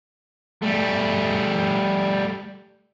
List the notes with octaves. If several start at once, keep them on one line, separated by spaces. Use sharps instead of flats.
G3 A3